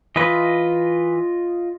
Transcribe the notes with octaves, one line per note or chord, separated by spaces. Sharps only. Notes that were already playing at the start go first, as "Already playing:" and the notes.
E3 F4 B4 D#5